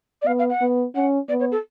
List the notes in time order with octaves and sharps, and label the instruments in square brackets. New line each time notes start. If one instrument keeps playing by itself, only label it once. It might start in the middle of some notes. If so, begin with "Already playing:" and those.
[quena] D5
[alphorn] B3 [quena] F5
[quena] F5
F#5
[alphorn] B3
[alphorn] C#4 [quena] F#5
[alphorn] B3 [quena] D5
[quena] C#5
A4